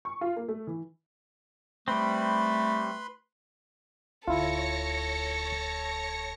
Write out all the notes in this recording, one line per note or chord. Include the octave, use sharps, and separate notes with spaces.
C#6
F4
A#3
A3
E3
G3 A3 C4 B4 B5 C6
D1 D2 E4 F4 A4 C#5 A#6 C#7